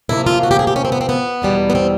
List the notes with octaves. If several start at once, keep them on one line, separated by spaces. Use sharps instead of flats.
F2 C3 F3 A#3 E4
F4
F#4
G4
G#4
G4
C#4
C4
B3
C4
B3
E2 B2 G3
B3
C4